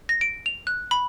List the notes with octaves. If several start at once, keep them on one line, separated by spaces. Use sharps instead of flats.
A#6
D7
F7
F#6
B5